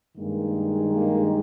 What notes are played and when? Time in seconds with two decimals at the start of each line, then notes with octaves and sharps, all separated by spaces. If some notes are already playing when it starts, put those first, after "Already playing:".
0.17 G2 D#3 G#3 A#3
0.95 A#3